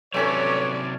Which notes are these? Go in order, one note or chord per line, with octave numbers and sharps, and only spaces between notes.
C3 F#3 A3 C#4 A4 B4 C#5 D5